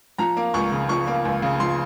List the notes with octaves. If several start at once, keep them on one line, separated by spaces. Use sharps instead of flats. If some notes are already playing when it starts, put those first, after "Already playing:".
F3 A#5
A#3
C#2 C#6
C#3
F3 C#6
A#3
C#2
C#3
F3 C6